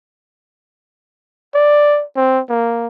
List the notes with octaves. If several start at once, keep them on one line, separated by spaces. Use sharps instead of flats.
D5
C4
A#3